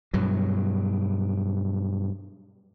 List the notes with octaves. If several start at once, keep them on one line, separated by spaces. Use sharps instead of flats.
G2 B2 F#3